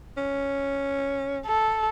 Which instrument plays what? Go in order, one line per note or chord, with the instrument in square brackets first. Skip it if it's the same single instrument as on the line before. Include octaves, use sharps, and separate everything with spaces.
[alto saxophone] C#4
[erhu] A4